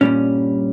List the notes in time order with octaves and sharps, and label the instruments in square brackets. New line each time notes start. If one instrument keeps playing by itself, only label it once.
[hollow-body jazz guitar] G2 G3 C#4 [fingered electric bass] A#2